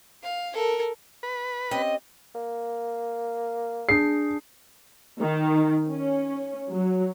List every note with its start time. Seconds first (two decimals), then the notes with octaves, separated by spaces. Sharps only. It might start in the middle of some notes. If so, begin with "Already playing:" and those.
0.23 F5
0.54 A4 A#4
1.23 B4
1.71 C4 C#4 G4 D#5
2.35 A#3
3.89 D4 G#4 C7
5.20 D#3
5.88 C#4
6.70 F#3